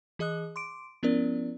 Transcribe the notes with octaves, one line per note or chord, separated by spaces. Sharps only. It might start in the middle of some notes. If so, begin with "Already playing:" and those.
E3 G#4 D#5 D#6 F#6
C6 D6 D7
F3 B3 C#4 E4 A#4 D5